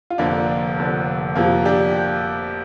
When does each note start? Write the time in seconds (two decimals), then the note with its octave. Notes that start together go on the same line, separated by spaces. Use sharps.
0.10 F4
0.18 F1 F2 D3 A#3 D4
0.77 F1 F2 D3
1.35 F2 C3 F3 A#3
1.65 D4 G4